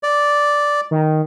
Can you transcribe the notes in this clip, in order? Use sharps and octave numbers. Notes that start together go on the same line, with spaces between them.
D5
D#3